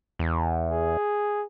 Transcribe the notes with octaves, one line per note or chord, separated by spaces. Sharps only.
E2
G#4